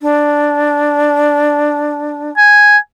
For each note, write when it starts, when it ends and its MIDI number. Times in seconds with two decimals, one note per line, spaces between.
0.01 2.31 62
2.37 2.78 80